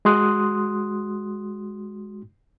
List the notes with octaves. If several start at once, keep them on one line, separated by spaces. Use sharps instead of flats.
G#3 F#4 C6 D#6 F#6